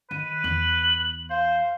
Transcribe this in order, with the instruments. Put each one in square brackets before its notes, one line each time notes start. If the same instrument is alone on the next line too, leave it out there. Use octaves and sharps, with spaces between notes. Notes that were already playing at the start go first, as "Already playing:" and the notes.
[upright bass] D#3 [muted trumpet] B4 [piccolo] D#7
[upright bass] E2 [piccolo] F#7
[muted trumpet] C5 [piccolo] F5